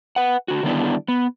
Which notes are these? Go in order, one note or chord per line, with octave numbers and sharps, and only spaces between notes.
B4 F#5
D3 F#4
D3 D#3 G3 B3 D4 E4
B3